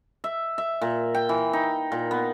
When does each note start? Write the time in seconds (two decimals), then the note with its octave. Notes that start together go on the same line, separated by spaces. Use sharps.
0.24 E5
0.58 E5
0.81 A#2
1.15 G5
1.29 E3
1.53 D#4
1.92 A#2
2.11 B3